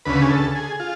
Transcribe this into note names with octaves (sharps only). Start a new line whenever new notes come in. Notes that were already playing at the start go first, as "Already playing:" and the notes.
D2 C#3 B4
G#4
A4
G#4
F4